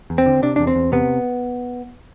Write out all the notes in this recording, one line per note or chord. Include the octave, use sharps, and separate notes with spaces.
E2
C4
D3
C3 D4
E2 D4
C4
E2
C3 B3